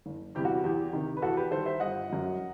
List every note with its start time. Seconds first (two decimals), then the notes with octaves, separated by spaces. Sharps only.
0.06 F#1
0.35 E2 C3 E3 G3 G4
0.45 F#4
0.64 E2 G4
0.93 C3 D#3
1.17 B4
1.22 E2 F#4 A4
1.37 G4 B4
1.51 D#3 G3 A4 C5
1.66 C5 E5
1.80 G1 D#5 F#5
2.10 F#2 F#3